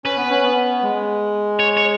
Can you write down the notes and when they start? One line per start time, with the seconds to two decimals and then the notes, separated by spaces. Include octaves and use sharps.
0.05 C#4 B4
0.17 B3
0.30 C#4
0.43 B3
0.82 G#3
1.60 C#5
1.77 C#5